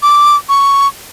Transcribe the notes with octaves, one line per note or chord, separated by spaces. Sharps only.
D6
C#6